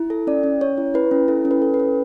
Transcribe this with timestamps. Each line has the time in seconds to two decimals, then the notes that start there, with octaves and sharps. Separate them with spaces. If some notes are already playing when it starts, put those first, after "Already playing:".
Already playing: E4
0.10 A4
0.27 C#4 D5
0.43 C#4
0.61 C#4 C#5
0.78 E4
0.94 E4 B4
1.11 C#4
1.28 E4 A4
1.45 C#4
1.51 B4
1.62 A4
1.74 B4
1.79 C#4